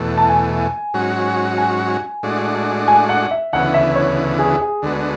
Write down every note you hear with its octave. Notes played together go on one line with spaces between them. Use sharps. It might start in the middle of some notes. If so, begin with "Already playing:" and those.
Already playing: E2 B2 A3
A5
G#5
G#2 F#3 C#4 F#4
G#5
A2 G#3 D4 F#4
G#5
F#5
E5
D2 C#3 E3 B3 F#5
E5
C#5
G#4
G#4
D2 D3 G#3 B3 F#4